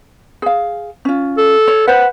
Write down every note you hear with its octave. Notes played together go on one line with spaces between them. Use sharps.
G#4 F5
C#4 F4
A4
C#5
B4 C5 F#5